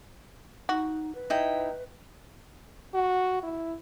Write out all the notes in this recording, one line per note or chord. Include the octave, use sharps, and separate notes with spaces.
D#4 F#4
B4
D#4 E4 G5
F#4
E4